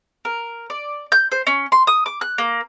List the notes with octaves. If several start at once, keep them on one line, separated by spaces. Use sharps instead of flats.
A#4
D5
G6
C5
C#4
C6
D#6
D6
F#6
A#3